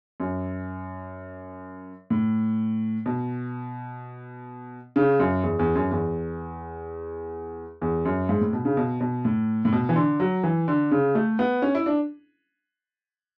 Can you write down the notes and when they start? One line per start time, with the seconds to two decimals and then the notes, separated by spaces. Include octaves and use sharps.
0.20 F#2
2.10 A2
3.06 B2
4.96 C#3
5.20 F#2
5.43 E2
5.59 E2
5.75 F#2
5.91 E2
7.81 E2
8.05 F#2
8.29 G#2
8.41 A2
8.53 B2
8.65 C#3
8.77 B2
9.01 B2
9.25 A2
9.65 A2
9.72 B2
9.89 E3
9.96 D3
10.20 F#3
10.43 E3
10.68 D3
10.91 C#3
11.15 A3
11.39 B3
11.62 C#4
11.75 E4
11.86 D4